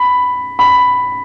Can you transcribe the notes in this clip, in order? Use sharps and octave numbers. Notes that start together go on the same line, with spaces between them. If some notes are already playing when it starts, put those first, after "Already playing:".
Already playing: B5
B5